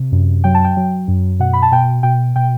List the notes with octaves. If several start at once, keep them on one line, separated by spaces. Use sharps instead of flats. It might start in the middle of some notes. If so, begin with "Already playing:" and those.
Already playing: C3
F#2
F#3 G5
A5
G5
F#3
F#2
B2 F#5
B5
A5
B2 G5
B2 G5
B2 G5